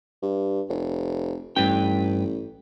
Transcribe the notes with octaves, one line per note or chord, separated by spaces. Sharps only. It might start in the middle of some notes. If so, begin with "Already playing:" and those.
G2
F1
A1 G2 B4 G5